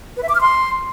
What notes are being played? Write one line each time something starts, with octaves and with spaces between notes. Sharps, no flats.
B4
E5
D6
F6
C6